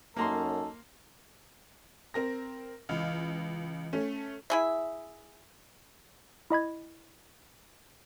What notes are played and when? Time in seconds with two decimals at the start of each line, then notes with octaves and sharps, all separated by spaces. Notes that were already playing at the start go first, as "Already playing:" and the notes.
0.17 F#2 A#3 C#4 D#4 A4 A#5 C6
2.14 C4 A#4 A#6
2.89 C#2 E3 D#5 F5
3.93 A3 C#4
4.50 E4 G#4 E5
6.50 E4 D#5 B5 G#6